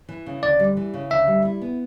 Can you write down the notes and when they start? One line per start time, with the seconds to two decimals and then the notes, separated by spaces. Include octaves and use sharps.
0.09 E3
0.26 C#3
0.43 D2 D5
0.59 G3
0.77 E3
0.94 C#3
1.10 D2 E5
1.27 G3
1.45 E4
1.62 B3